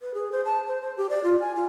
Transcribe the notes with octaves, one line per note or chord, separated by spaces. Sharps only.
B4
G#4
C5
A5
C5
C5
G4
D5
F4
G#5
F4